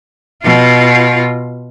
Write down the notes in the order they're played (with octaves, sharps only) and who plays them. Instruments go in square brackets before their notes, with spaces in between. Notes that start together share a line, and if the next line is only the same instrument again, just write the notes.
[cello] B2 F4